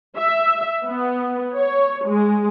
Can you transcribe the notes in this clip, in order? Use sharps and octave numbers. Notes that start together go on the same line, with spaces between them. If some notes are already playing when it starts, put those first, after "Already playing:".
E5
B3
C#5
G#3